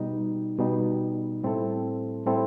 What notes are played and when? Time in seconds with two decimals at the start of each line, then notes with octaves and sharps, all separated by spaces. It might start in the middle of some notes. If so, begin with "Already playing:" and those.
Already playing: B2 G3 D#4
0.58 B2 G3 D#4
1.43 A2 G3 C4 E4 A4
2.26 A2 G3 C4 E4 A4